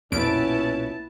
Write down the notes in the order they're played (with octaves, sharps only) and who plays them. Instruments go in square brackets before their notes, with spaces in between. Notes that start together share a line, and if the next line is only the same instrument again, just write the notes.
[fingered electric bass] B1 A#2 [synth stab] F2 D7 [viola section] B3 E4 A5 [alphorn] C#4